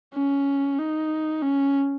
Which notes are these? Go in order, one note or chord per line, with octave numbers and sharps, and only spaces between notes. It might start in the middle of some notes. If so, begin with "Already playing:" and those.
C#4
D#4
C#4